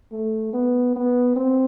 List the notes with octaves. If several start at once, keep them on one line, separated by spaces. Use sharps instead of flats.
A3
B3
B3
C4